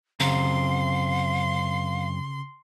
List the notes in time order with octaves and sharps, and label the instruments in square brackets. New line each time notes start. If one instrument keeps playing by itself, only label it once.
[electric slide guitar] F#2 C4 A#5 [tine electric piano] C#3 [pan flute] F5 [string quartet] C6